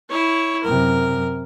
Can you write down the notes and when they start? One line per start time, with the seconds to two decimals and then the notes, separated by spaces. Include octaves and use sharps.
0.10 E4 C#5
0.64 F#2 C3 A#4